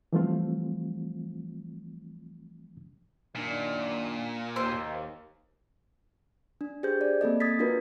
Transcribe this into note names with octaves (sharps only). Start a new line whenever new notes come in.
E3 F3 G3 A3 C4 F4
F#2 A#2 D#3 D4
D#2 C5 E6
D4
G4 G#4 C5 G6
D5
A#3 C4 A4 D#5
D#6 G#6 A6 B6
D4 F4 F#4 A#4 B4